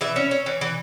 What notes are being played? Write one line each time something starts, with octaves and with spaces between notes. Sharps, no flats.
E3 E5
C#4
C#4
E3
E3